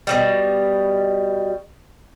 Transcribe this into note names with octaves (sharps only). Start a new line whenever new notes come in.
B2 E3 G3